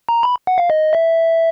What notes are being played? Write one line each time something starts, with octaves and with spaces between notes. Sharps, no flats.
A#5
B5
F#5
F5
D#5
E5